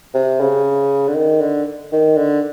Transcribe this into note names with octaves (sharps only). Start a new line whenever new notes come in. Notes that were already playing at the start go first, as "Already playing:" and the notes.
C3
C#3
D3
D#3
D3
D#3
D3